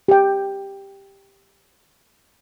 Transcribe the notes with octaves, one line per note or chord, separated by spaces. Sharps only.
G4 G5